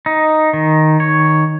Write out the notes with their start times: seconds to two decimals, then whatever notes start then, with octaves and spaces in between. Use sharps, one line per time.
0.06 D#4
0.53 D#3
1.00 C#5